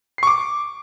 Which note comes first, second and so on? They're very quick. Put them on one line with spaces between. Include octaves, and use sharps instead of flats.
C7 C#6 D6